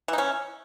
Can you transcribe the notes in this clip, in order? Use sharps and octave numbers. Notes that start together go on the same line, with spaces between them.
E3 C#4 D#4